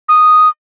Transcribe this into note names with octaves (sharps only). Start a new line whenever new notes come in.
D#6